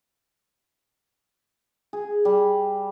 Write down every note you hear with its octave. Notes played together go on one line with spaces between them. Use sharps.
G#4
G3